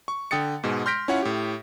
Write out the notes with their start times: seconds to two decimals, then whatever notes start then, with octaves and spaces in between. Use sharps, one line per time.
0.08 C#6
0.31 D3 G5 D#6 A6 C#7
0.63 G#2 B2 G#3
0.86 C6 F6 G6 A#6 B6 D7
1.08 C#4 E4 F4 C#5 F#5
1.22 A2 G4